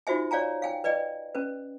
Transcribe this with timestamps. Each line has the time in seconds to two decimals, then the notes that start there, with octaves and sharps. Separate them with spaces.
0.07 D#4 F4 F#4 C5 E5 G#5
0.31 C#5 D5 F5 G#5 A#5
0.62 F5 G5 G#5
0.84 B4 D5 D#5 G5
1.35 C#4 B4